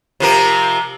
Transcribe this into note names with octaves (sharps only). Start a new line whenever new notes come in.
C3 F3 A#4